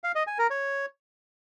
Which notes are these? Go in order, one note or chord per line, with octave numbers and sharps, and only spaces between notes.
F5
D#5
G#5
A#4
C#5